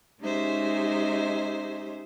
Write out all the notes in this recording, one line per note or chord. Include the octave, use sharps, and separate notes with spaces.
G#3 C#4 D#4 G4 C5 E5